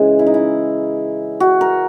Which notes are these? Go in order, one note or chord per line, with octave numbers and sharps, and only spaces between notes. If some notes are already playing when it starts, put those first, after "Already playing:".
Already playing: C#3 E3 G#3 G#4
E4
D#4
E4
F#4
A#4